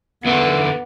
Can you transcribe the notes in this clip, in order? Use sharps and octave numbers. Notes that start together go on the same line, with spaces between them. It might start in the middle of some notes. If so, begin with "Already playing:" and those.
E2 D3 B3